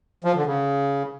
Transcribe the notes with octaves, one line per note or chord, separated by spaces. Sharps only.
F3
D3
C#3